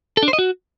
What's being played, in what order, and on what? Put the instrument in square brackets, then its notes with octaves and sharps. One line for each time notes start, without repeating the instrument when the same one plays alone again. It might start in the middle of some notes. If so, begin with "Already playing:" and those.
[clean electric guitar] A4
D4
C5
D#5
F#4